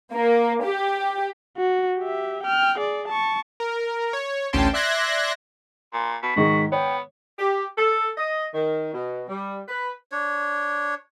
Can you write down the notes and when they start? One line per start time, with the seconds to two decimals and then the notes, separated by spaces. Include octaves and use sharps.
0.13 A#3
0.64 G4
1.57 F#4
1.99 G4 E5
2.44 G5 F6
2.78 G#4 D5
3.08 A5 C#6
3.60 A#4
4.13 C#5
4.53 A1 D2 C#4 G5 A5 C6
4.73 D5 E5 C6 F#6 G#6 A#6
5.93 A#2 C6
6.23 B2 B6
6.36 G#2 D#3 G#3 F#4
6.72 B3 C#5 G5
7.39 G4
7.77 A4
8.17 D#5
8.55 D#3
8.93 B2
9.29 G3
9.68 B4
10.12 D4 C#5